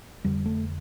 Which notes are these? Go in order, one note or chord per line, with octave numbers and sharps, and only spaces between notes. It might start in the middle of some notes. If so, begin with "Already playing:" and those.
F1 F2 D3 G3
A3